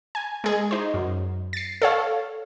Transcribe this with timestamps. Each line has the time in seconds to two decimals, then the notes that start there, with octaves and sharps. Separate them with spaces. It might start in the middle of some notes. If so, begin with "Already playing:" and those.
0.15 G#5
0.44 G#3 G#4
0.71 D#4 C5
0.94 F#2
1.53 A6 C7
1.82 A4 C#5 F5